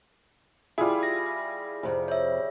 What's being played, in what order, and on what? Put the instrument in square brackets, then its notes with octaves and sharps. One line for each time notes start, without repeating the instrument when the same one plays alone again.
[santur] G3 G#4 [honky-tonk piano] E4 F4
[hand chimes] A#6
[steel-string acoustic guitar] F2 C3
[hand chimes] C#5 E5